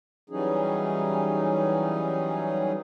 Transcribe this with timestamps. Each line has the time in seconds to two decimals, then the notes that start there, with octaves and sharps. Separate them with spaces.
0.30 E3 F#3 G3 C#4 D#4 G#4